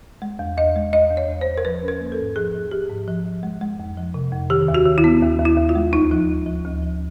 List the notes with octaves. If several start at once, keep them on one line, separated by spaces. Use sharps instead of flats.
G#3
E2
E2 D#5
G#3
E2 D#5
E2
C#5
E2
C5
E2
A#4
F3 B4
C#4
A#4
A#3
A4
G#2
F3 G#4
F3
F3 G4
G#2
F3
F3
G#3
G#3
F2
F3
C3
F2
D#3 G4
D#2
F#4
D#3
E4
B3
D#2
D#2
E4
D#2
F4
G#3
D2 D#4
F3
D2
F3
D2
F3